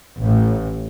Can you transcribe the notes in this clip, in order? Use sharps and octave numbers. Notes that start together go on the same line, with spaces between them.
A1 A2